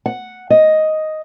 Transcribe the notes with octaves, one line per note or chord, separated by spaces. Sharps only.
F#5
D#5